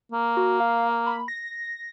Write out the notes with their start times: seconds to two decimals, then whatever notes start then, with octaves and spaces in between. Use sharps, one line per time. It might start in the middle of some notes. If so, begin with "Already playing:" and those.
0.12 A#3
0.37 F#4
0.60 F5
1.07 B5
1.28 A#6